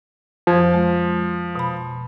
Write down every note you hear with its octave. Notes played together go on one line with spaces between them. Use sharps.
F2 F3 G#6
G#3
B2 B5